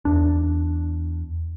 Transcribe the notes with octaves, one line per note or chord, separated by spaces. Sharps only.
E2 D4